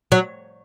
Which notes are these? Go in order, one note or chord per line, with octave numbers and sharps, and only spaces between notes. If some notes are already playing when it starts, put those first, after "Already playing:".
F#3